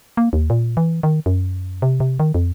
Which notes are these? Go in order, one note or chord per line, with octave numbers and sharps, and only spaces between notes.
A#3
D#2
A#2
E3
D#3
F#2
C3
C3
D#3
F2